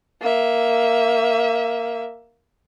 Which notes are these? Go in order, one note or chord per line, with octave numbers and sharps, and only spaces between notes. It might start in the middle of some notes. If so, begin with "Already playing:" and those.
A#3 E5